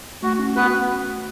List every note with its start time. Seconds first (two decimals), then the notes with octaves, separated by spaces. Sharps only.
0.23 A3 F#4
0.39 C#4
0.56 B3 F#4 B4